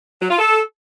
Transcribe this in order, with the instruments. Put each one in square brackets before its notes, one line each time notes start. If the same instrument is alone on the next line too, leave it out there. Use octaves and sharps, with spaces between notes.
[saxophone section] F#3
F4
A4